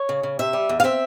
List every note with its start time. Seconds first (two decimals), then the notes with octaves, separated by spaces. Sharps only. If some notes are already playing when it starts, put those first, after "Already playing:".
Already playing: C#5
0.09 C#3
0.23 C#3
0.39 C3 E5
0.53 G3
0.69 E2
0.80 F5
0.84 C4 E5